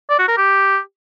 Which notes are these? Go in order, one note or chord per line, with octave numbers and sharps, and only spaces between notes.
D5
F#4
A#4
G4